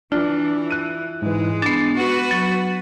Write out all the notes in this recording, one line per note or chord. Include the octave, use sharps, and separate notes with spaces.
E3 D4 F4
F#6 D#7
G#2 E3 G#3
B3 D4 A6 C7
F#4 B4
F#3